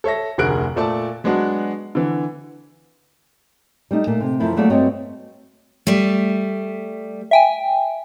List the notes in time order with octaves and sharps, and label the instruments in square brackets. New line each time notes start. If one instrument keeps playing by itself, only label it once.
[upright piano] A4 C#5 E5 A#6
F1 D2 G#4 A#4 F#6 D7
A#2 A3 D5 A5
F#3 G#3 B3 D4 F#4
D3 E3
[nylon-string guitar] G3 A3 D#4
A#2 A3 A#3
C3
F#2 F3 A3 E4
F#3 G3 A3 A#3 G#4 D5
G2 A3 C4 F#4 C#5 D#5
[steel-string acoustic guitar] G3 A3
[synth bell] E5 G5 G#5